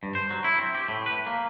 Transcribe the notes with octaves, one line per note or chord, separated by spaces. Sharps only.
G2
C5
F#3
E4
C4
G4
A2
B4
A#3